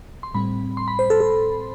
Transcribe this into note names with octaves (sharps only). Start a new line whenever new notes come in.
C6
A2 G3 C4 B5
C6
B5
C5
A4
A4